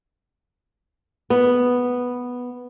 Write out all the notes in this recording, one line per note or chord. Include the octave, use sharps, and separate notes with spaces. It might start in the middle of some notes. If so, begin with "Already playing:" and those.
B3